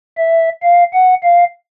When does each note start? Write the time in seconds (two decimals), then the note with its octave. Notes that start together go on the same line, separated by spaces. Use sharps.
0.17 E5
0.62 F5
0.93 F#5
1.23 F5